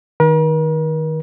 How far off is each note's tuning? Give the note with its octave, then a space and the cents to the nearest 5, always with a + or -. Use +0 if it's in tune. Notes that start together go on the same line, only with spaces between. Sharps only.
D#3 +0 A#4 +45